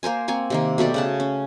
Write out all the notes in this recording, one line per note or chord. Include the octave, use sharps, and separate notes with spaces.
A#3 A#4 C5 G#5
A#3 C4 G#5 C#6
C3 D#3 A#3
B2 A3 G4 D5
C#3 F#5 A5
C#4